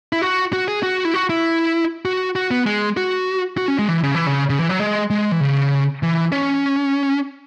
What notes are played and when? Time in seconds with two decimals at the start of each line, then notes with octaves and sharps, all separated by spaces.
0.13 E4
0.22 F#4
0.53 F#4
0.68 G#4
0.83 F#4
1.05 E4
1.14 F#4
1.29 E4
2.05 F#4
2.36 F#4
2.51 B3
2.66 G#3
2.97 F#4
3.58 F#4
3.68 C#4
3.79 G#3
3.89 E3
4.03 C#3
4.15 E3
4.27 C#3
4.50 C#3
4.59 E3
4.69 F#3
4.80 G#3
5.10 G#3
5.32 E3
5.40 C#3
6.03 E3
6.32 C#4